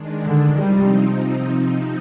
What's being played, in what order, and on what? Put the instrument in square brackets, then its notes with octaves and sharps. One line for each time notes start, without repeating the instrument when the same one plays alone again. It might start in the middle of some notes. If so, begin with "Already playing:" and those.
Already playing: [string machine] D#3 G#3 D4
[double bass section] D3
[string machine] C3 F3 C4 D#4 [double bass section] G3